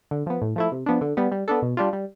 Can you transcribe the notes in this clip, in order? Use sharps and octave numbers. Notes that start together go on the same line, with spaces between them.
D3
F3 B3
A2
F3 A3 E4
C3
F3 B3 D4
D3
G3 B3
G3
B3 D4 A4
B2
G3 D4 F4
G3